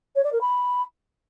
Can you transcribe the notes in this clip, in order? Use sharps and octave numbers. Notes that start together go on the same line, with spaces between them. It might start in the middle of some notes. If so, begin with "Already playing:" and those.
C#5
D5
A#4
B5